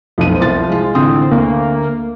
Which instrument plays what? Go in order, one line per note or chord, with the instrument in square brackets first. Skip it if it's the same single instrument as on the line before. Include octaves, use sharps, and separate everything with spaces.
[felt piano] F1 B1 D#7 [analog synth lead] F3
[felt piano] C2 F4 A6
G#3 F4
[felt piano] A1 D3 D#6 [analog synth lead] C4
[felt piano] D2 [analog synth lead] A#3